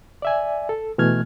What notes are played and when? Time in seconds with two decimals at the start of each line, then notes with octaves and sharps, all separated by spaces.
0.22 D5 E5 G#5
0.69 A4
0.98 B2 E3 A3 F6 G#6